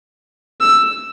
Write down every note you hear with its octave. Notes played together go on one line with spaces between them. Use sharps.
E6